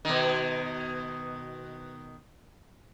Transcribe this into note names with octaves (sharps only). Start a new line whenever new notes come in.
B2 D#3